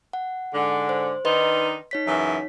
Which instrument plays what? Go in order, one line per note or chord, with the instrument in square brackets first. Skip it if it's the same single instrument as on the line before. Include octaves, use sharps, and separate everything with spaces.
[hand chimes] F#5
[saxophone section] G#2 D3
[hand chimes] C5
[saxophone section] D#3 D4 D#4 [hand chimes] B4 D#5 C6
[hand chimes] D#4 C#5 B6
[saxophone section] F#2 C#3 E3